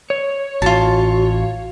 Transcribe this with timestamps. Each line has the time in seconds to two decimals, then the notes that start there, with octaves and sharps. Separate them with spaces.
0.10 C#5
0.62 A1 F4 F#4 A5